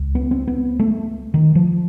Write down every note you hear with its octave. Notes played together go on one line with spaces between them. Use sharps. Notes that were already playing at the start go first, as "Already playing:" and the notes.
Already playing: C#2
B3
C4
B3
A3
D#3
F3